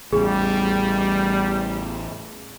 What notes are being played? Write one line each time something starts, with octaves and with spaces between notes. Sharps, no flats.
A1 E2 C#3 G3 G#4